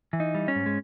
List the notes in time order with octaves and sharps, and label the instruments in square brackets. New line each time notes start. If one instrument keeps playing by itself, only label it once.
[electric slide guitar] E3
D#4
G3
C#4
G#2
G#3